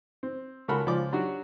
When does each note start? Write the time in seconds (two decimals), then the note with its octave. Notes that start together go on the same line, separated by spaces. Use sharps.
0.23 C4
0.68 C#2 F#4 A4 A#4 F#5 B5
0.86 C#2 F3 D5 D6
1.13 F#3 D4 F#4 G4